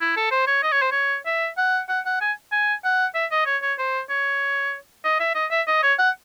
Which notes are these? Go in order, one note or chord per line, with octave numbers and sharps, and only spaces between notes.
E4
A4
C5
C#5
D#5
C#5
C5
C#5
E5
F#5
F#5
F#5
G#5
G#5
F#5
E5
D#5
C#5
C#5
C5
C#5
D#5
E5
D#5
E5
D#5
C#5
F#5